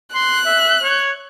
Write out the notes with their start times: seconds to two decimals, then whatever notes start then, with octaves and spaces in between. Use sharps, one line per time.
0.14 C6 F#6
0.46 E5
0.82 C#5